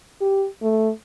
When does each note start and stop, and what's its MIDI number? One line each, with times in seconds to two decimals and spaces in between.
0.21 0.47 67
0.62 0.91 57